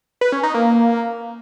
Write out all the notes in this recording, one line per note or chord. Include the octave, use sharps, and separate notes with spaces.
B4
C#4
D#4
A#3